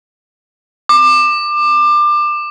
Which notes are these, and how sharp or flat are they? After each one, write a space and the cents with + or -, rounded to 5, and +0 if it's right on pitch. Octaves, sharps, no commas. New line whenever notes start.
D6 +25